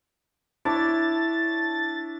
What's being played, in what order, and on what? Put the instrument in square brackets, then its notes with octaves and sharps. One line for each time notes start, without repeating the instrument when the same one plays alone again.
[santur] D4 C#5 D6 [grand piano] E4 [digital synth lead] A6